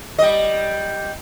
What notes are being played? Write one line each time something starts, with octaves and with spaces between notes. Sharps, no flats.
G3 D#5